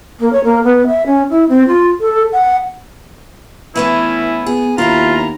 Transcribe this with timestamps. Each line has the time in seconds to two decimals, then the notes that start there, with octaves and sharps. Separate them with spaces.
0.19 A#3
0.32 C#5
0.44 A#3
0.63 B3
0.86 E5
1.06 C#4
1.29 E4
1.48 C4
1.67 F4
2.00 A4
2.32 F#5
3.76 E3 A3 B3 C#4 E4
4.46 B3 G#4
4.78 D#2 B3 C#4 E4 F4 A#5